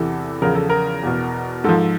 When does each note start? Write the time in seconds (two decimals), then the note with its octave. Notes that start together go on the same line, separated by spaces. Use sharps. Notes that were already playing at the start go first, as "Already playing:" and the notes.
Already playing: E2 C3 E3 A4
0.42 E2 C#3 F3 A#4
0.55 A4
0.70 A#4
1.03 E2 B2
1.64 G#2 F3 A4